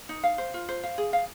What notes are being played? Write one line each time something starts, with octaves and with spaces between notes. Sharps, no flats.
D#4
F5
C5
F4
C5
F5
G#4
F5